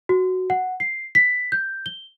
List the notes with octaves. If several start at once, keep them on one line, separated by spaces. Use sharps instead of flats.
F#4
F#5
C7
B6
G6
G7